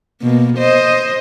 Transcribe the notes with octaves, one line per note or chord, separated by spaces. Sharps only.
B2 A#3
C5 D#5